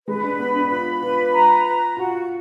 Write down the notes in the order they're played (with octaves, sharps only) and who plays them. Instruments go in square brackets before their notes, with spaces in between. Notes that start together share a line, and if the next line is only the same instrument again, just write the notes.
[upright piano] G#3 [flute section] B4
[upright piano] D4
[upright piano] B3 [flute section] B5
[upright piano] D4
[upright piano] F4 [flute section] B5
[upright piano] F4 [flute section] B4
[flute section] A#5
A#5
[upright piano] F4 [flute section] F#4